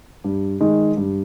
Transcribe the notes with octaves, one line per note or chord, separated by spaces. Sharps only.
G2
D#3 G#3
G2